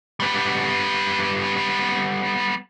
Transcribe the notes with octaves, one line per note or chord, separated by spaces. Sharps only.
G3 B3